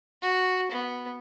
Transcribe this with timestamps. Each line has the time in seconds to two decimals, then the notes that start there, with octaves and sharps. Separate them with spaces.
0.22 F#4
0.72 B3